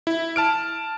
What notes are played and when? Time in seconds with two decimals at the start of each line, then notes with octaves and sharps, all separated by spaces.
0.07 E4
0.36 A5 F6 D7